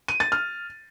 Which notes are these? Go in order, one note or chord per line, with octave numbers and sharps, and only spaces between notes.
D#7
A6
F6